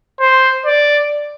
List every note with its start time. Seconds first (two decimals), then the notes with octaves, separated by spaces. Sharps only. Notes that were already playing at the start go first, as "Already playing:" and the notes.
0.20 C5
0.66 D5